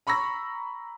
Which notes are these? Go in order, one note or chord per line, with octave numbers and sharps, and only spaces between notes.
A#5 B5 C#6 E6 A#6